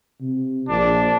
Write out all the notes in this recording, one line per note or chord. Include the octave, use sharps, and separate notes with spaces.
C3
A#1 D4